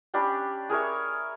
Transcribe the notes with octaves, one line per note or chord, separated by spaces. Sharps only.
C#4 D4 G4 B5
G#4 A#4 C#5 E5